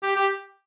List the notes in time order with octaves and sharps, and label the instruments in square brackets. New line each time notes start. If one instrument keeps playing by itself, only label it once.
[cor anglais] G4
G4